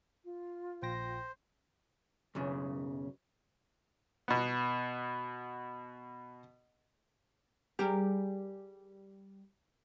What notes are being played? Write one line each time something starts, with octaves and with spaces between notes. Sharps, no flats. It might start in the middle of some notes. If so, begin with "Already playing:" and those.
F4
A#1 C5 G5 A#6
B1 F#2 C#3
B2 B3
G3 G4 G#4 A#4